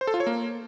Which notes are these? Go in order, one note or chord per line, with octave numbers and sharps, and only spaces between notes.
C5
A4
F4
C#5
A#3